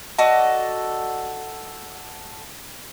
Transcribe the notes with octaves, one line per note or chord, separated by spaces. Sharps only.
F#4 A4 D5 D#5